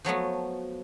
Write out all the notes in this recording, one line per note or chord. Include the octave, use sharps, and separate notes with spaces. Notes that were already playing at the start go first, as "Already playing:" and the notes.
F3 F#3 A3 B3